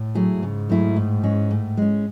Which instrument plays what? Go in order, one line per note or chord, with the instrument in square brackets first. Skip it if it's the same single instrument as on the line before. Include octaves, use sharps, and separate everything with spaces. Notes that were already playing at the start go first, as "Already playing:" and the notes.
Already playing: [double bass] A2
[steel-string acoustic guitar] F#3 A3 E4 G#4
[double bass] G#2 [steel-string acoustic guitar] C#3
[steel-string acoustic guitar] F#3 A3 E4 G#4
A2
G#3 C#4
A2
G#3 C#4